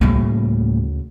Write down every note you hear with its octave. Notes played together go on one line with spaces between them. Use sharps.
D2 A2 C#3 G3 A#3